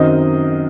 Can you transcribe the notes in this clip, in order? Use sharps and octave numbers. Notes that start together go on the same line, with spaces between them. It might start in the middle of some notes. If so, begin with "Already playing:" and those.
Already playing: F#2 D#3 F#3 C4 D#5